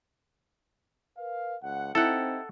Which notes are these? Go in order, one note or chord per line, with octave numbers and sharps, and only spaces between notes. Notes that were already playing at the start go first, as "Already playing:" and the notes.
A#4 B4 F5
C#2 F#5
C4 D#4 E4 G4 A4 F#5